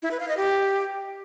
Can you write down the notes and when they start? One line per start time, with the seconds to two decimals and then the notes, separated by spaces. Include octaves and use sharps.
0.03 E4
0.11 B4
0.20 F5
0.28 D#5
0.37 G4